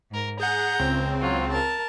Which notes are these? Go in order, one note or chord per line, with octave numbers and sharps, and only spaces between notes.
G#2 A#4
G#4 F#5 A#5 G6
C#2 C#3 C4
F#3 F4
A#4 A5